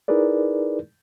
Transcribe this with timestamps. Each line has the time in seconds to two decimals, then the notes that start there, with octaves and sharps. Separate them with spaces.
0.08 D#4 E4 G#4 A#4 B4 D5